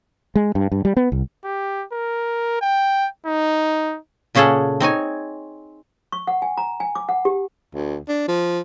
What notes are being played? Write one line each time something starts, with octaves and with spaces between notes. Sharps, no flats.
G#3
G2
G2
G3
B3
C2
G4
A#4
G5
D#4
A#2 C#3 C#4 G#4 A4 F#5
C4 D#4 C#5 G#5
C#6
F#5
G#5
A#5
G#5
D6
F#5
G4
D2
D4
F3